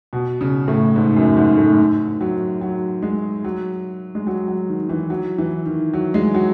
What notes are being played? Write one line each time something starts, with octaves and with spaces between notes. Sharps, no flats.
B2
C#3
A2
G#2
F#2
G#2
A2
F#3
F#3
G#3
F#3
G#3
F#3
F#3
D#3
E3
F#3
E3
D#3
F#3
G#3
F#3